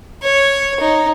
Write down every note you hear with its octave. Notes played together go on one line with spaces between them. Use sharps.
C#5
D#4